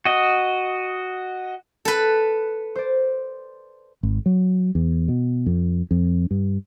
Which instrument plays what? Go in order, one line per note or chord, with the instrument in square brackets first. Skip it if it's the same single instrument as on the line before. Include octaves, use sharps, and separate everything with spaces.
[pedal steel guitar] F#4 D#5
[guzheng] A4 B4
[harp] C5 D5
[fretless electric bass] G#1
F#3
E2
B2
F2
F2
G2